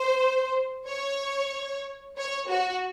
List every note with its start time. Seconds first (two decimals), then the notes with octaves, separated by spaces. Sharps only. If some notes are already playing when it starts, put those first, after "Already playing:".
Already playing: C5
0.87 C#5
2.17 C#5
2.49 F#4